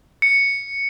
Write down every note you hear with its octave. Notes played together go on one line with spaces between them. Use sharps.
C#7